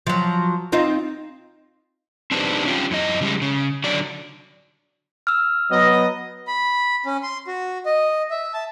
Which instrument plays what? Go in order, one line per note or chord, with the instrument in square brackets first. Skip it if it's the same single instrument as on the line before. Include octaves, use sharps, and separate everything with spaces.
[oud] F3 F#3
C4 D#4 F4
[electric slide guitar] C4 D4 D#4 G4 B4 C5
C#4 F4 G4
F#2 E4 D#5
C#3 G3 G#3
C#3
D3 F#3 D5
[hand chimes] E6 F6
[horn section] F#3 B3 D#5
[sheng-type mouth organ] B5
C#4
C6
F#4
D#5
E5
A5